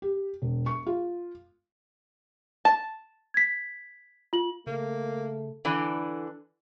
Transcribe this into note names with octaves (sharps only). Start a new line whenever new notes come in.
G4
E1
C#6
F4
A5 E7
G#6 B6
F4 F#7
C#3 A3 A#3
D3 E3 D4